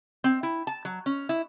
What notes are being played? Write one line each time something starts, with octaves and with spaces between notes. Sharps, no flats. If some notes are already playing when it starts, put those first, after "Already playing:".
C4
E4
A5
F#3
C#4
E4